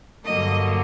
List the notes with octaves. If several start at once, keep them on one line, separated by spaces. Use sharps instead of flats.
G2 D3 F#3 A#3 D#5